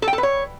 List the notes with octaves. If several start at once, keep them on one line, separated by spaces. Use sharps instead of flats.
A4
G5
A4
B4
C#5